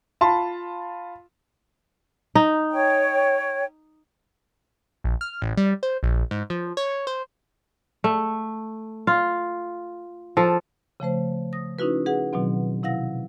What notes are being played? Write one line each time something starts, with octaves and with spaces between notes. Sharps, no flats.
F4 A5 B5 C6
D#4
C#5 G5
A#1
F6
A1
G3
C5
A#1
G#2
F3
C#5
C5
A3
F4
F3 A4
C#3 F3 A3 C5
D#6 A#6
C#4 D#4 E4 F#4 B4
G#4 B4 F#5
B2 D#3 F#3 C4
C3 E4 F5 F#5 A#6